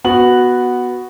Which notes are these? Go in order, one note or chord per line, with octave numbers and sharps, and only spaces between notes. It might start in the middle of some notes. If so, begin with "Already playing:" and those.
B3 F#4 F#7